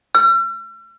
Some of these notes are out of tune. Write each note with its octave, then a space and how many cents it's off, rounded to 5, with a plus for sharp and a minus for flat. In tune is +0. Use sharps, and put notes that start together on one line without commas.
E6 +45